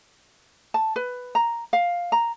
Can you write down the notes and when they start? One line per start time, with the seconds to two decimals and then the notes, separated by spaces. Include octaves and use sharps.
0.74 A5
0.96 B4
1.35 A#5
1.73 F5
2.12 A#5